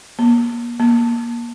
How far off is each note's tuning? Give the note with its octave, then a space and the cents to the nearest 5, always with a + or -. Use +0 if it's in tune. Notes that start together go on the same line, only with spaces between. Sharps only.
A#3 +35
A#3 +20